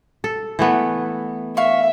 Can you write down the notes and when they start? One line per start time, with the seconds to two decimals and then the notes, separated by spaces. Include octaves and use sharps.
0.24 A4
0.59 E3 A3 B3
1.57 E5 F5 C#6